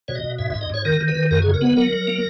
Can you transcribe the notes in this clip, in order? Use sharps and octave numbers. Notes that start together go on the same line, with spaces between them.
B2 C#5
D#5
B2
G#2 E5
E5
G#2
D#5
G#2 C#5
D#3 A#4
D#3
B4
D#3
F#2 A#4
G#4
C#3
A#4
B3 B4
F#3 A#4
F#3
A#3